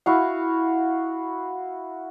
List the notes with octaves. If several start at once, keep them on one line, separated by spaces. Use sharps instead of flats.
E4 F#4 F5